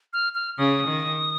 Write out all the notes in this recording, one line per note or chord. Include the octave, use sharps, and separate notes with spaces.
F6
F6
C#3 D#6
D#3